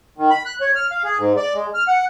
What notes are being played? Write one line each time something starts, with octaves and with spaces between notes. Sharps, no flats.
D#3
B5
F#6
C#5
F6
F5
G#4
G#2
D5
G#3
F6
F#5